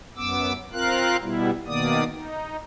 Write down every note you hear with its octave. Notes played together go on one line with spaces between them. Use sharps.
F#2 B3 D6 E6
C4 F4 A#4 F5 F#6
B2 G3 B3 E4
B2 D#3 A#3 B3 D5 D#6
D#4